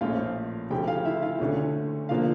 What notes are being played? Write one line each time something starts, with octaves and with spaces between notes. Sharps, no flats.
A#1 A2 F3 A3 C#4 F4 F5
D2 C#3 F3 G4 G5
F4 F5
E4 E5
F4 F5
D2 D3 A3 C#4
D3 F3 A#3 F4 F5